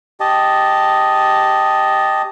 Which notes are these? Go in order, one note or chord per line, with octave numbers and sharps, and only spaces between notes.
G4 D#5 A5